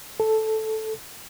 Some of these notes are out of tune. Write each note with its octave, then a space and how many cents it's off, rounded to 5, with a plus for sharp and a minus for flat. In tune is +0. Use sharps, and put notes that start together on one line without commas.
A4 -5